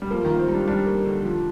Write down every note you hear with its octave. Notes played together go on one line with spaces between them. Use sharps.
G3
F3 A#3
D#3
F4
C4
G3
D4
G3 D4
A#3
D3
F3